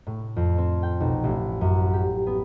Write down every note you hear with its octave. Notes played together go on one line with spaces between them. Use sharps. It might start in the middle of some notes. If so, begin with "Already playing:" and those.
A2
F2
C4
G5
B1
A1
F#2
G4
B3